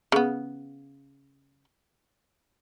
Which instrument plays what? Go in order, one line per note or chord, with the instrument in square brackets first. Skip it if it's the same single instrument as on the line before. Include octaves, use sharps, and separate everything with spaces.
[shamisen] C#3 B3